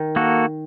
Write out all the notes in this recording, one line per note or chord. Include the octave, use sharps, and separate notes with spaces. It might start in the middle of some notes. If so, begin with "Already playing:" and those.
Already playing: D#3
A#3 F#4 A4